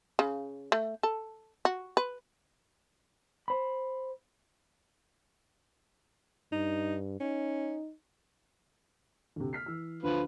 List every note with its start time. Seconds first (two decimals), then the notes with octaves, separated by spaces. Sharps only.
0.19 C#3
0.72 A3
1.03 A4
1.65 F#4
1.97 B4
3.48 C5 B5
6.53 G2 D#4
7.21 C#4 D#4
9.36 D2 C3
9.53 F6 B6 C7
9.66 E3 E6
10.03 D2 D3 F3 B4